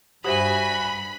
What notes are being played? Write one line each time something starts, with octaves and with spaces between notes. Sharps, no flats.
G2 F#4 G4 C5 E5 G#5 B5